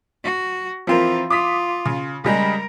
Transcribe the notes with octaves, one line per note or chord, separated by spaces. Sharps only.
F#4
E3 F3 C4 F4 A#4
F4 D6 D#6 B6
C#3
C#3 G3 G#3 A#4